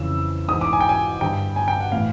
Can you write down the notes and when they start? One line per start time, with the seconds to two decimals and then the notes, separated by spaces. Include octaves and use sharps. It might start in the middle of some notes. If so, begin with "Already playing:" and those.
Already playing: F2 C#3 E3 E6
0.48 G#2 E3 D#6
0.61 D6
0.73 G#5
0.80 G5
0.89 G#5
1.21 G2 D3 G5
1.56 G#5
1.68 G5
1.81 F#5
1.92 A2 E3 F5